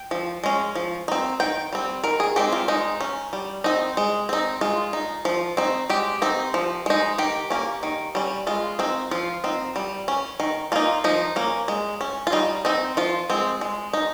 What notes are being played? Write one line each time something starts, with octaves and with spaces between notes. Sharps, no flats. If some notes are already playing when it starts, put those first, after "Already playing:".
Already playing: G5
F3
G#3 C#4
F3
C4 D#4
D#3 G5
G3 C4
D#3 A#4
G#4
G#3 C4 D#4 G4
F4
G#3 D#4
C#4
G3
C4 D#4
G#3
C4 D#4
G#3 F4
D#4
F3
C4 D#4
G#3 G4
C4 D#4
F3
G#3 D#4
D#3 G4
A#3 C#4
D#3
G3 C#4
G#3 F4
C4 D#4
F3 F4
C4 D#4
G3
C#4
D#3
A#3 D#4 F4
F3 D#4
A#3 C#4
G#3
C#4
F4
G3 D#4
C4 D#4
F3 F4
G#3 C4
G#3
D#4